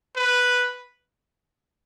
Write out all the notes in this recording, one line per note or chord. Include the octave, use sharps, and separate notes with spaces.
B4